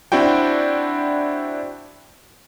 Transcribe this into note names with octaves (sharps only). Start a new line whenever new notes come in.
C4 D4 E4 F#4 G5